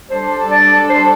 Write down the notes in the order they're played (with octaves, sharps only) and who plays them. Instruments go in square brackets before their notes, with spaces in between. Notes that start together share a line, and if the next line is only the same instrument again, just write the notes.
[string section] G3 D4 A4 [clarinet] C5
[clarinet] D5
C5